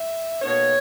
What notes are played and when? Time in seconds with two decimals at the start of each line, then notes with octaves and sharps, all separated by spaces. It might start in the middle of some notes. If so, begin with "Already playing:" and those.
Already playing: E5
0.42 B2 A#3 D#4 C#5